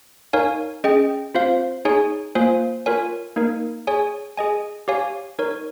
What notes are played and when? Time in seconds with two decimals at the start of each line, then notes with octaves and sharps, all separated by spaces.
0.33 D#4 A#4 C#5 F5 G#5
0.84 C#4 G#4 D#5 G5
1.34 C4 F4 C5 F5
1.85 D#4 G#4 C#5 G#5
2.35 A#3 F4 C5 F5 G#5
2.86 F4 A#4 C#5 G#5
3.36 A#3 D#4 A#4
3.87 G#4 C#5 G#5
4.37 G#4 D#5 G#5
4.88 G4 C#5 F5 G#5
5.39 D#4 A#4 C#5